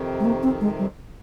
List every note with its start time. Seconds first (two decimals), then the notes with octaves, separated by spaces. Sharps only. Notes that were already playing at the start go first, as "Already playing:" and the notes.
Already playing: F2 C3 D#3
0.20 G#3
0.25 A#3
0.43 C4
0.61 G#3
0.79 G3